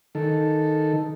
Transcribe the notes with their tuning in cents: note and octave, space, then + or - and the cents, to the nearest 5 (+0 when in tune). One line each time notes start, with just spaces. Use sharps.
D#3 +0 A4 +0